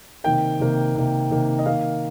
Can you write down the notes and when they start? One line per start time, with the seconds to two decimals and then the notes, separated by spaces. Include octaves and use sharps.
0.24 C3 D#3 A#3 G5
0.60 C3 D#3 A#3
0.96 C3 D#3 A#3
1.31 C3 D#3 A#3
1.59 D#5
1.66 D#3 A#3 F5